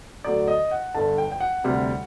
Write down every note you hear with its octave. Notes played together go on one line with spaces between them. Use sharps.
D2 D3 F#3 D5
D#5
F#5
G1 G2 D3 A5
G5
G5
F#5
D2 C3 G3